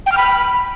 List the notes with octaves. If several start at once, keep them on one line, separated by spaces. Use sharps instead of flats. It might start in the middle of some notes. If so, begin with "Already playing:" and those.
G5
F6
B5